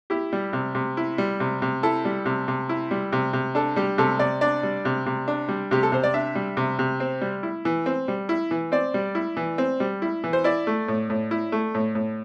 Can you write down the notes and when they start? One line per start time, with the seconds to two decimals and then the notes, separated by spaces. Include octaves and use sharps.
0.10 E4 G4
0.33 G3
0.53 C3
0.75 C3
0.97 E4
1.18 G3
1.40 C3
1.62 C3
1.83 E4 A4
2.05 G3
2.26 C3
2.48 C3
2.69 E4
2.91 G3
3.12 C3
3.33 C3
3.55 D4 A4
3.76 G3 G4
3.98 C3 A4
4.19 C3 D5
4.41 D4 D5
4.63 G3
4.85 C3
5.06 C3
5.28 D4
5.49 G3
5.71 C3 G4
5.83 A4
5.92 C3 C5
6.03 D5
6.14 D4 E5
6.35 G3
6.57 C3
6.79 C3
7.00 C4
7.21 G3
7.43 E4
7.65 E3
7.86 C4
8.08 G3
8.29 E4
8.51 E3
8.72 C4 D5
8.94 G3
9.15 E4
9.37 E3
9.58 C4
9.80 G3
10.02 E4
10.24 E3
10.33 C5
10.44 E4 D5
10.67 A3
10.88 A2
11.10 A2
11.31 E4
11.52 A3
11.74 A2
11.95 A2